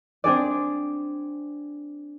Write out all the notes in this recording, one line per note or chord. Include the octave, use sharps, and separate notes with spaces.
C4 D4 G#4 D5